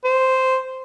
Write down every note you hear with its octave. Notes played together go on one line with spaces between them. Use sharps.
C5